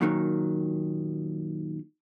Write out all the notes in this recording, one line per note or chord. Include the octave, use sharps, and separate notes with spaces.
F#2 A#2 D#3 E3 F#3